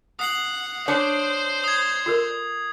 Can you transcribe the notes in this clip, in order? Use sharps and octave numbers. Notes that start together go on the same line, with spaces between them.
F#5 D#6 C7 F#7
D4 C5 C#5
D#6 G#6
F4 A4 A#4